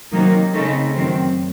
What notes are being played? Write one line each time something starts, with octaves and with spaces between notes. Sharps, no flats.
C3 D#3 F#3 A#3 D#4
C#3 A3 C4 D#4
F#2 D#3 F#3 C4